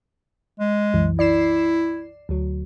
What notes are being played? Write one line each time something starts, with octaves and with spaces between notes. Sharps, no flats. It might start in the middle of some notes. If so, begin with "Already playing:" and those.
G#3
C2 F#2 E3
E4 D5 C7 E7
D2 F#3